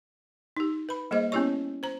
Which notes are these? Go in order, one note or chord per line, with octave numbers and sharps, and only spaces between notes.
D#4 G4
B4 B5
G3 A#3 G#4 C5 D#5
B3 C#4 E4 G4 C#5 C#6
C5 A#5